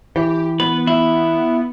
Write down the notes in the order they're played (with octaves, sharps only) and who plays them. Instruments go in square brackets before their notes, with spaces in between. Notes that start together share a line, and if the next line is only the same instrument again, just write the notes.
[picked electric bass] E3 [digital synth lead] G4
[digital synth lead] B3 [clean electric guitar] B4
[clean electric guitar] E4